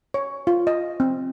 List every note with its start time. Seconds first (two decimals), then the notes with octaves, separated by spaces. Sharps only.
0.14 C#5
0.47 F4
0.67 D#5
1.00 C4